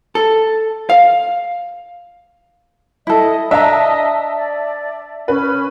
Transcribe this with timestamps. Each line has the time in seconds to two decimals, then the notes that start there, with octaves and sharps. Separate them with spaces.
0.15 A4
0.90 F5
3.07 E4 A4 D#5
3.51 D4 D#5 E5 A5 A#5
4.35 D5
5.28 C#4 B4